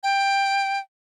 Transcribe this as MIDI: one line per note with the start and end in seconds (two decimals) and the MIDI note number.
0.03 0.79 79